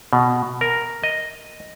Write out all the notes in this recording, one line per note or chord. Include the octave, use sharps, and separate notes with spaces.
B2
A#4
D#5